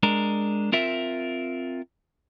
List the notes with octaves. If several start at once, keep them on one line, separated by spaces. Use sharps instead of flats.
G#3 D4 A#4
C4 F4 A#4 E5